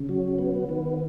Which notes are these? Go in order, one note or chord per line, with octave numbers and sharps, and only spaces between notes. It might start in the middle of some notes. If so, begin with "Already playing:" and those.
Already playing: C#3
F#3
B3
D#3